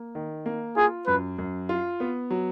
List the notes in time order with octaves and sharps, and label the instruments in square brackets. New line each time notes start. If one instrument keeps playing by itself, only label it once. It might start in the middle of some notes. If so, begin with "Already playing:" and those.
Already playing: [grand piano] A#3
D#3
A#3
[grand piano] F4 [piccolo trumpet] G#4
[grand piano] F#2 [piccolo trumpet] B4
[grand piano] F#2
F4
B3
F#3